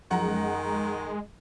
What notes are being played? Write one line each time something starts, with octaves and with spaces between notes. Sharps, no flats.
F#2 D#3 F3 G#3 F#5 A#5